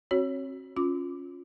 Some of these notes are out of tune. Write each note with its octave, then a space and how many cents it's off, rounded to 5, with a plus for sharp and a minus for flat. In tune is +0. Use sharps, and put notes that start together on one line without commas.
C4 +45 F#4 +0 C#5 +0
C#4 +0 F4 +15 D6 +0